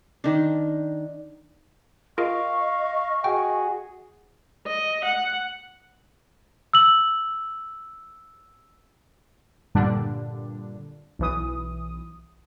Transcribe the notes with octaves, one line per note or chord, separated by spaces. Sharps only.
D#3 D4
F4 G#4 A#4 D#5 F5 C#6
F#4 G#4 G5
D#5
F#5
E6 F#7
G2 A#2 D3 G3 D4
B1 E3 D#6